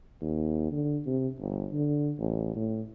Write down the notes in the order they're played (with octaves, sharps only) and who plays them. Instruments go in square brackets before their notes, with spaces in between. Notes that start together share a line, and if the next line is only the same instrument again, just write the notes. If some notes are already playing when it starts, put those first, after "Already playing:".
[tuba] D#2
D3
C3
G1
D3
A1
A2